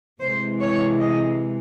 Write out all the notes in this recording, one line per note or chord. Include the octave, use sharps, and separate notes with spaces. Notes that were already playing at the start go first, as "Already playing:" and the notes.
C3 E3 G#3 C5
C#5
D#5